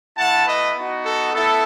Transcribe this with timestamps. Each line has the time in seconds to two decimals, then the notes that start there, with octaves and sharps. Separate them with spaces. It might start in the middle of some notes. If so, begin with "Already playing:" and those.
0.17 A3 E4 F#5 A5
0.46 B4 D#5
0.75 B3 D#4 F#4
1.04 A4
1.33 B3 E4 A4